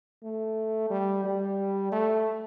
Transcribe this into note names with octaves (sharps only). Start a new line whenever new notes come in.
A3
G3
G3
A3